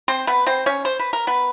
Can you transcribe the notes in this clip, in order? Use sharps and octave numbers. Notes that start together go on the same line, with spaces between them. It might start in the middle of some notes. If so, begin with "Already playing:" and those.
C4 C5
B3 B4
C4 C5
C#4 C#5
C5
B4
A#4
B3 B4